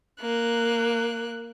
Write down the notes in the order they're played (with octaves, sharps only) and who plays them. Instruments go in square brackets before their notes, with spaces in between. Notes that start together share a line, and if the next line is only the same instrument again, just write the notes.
[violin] A#3 F#6